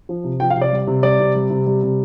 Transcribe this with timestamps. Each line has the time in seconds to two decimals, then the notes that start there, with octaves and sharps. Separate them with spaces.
0.09 F3
0.24 C3
0.40 F3 G5
0.50 F5
0.56 C3
0.61 D5
0.72 G3
0.87 C3
1.03 G3 D5
1.20 C3
1.35 G3
1.50 C3
1.67 G3
1.83 C3